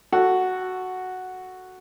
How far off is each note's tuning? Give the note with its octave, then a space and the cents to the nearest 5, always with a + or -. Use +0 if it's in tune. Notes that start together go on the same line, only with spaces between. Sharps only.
F#4 +0 A4 +10